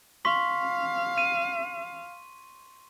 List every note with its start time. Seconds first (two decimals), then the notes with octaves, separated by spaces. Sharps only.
0.25 F5 C6 C#6 B6
1.18 D#7